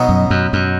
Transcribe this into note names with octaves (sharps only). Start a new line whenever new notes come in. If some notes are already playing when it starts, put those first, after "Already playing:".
Already playing: B2 F#3 B3 D#4
F#2
F#2
F#2